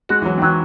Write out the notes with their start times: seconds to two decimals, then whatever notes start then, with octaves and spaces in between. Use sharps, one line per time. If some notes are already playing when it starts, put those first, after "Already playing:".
0.09 G#3 F#4
0.22 E3
0.25 F#3
0.38 D#3
0.42 E3 F#3